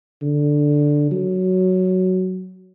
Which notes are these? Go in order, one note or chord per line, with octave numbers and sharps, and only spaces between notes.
D3
F#3